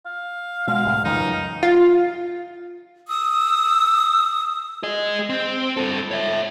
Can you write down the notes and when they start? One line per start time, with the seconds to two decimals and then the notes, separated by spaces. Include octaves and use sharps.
0.06 F5
0.67 B2 G#3 F5
0.84 C2 A2
1.05 C#2 F#2 E3 D#4
1.63 F4
3.08 D#6 E6
4.83 G#4 D#5
5.30 C4
5.77 G2 A4
6.11 C#5 E5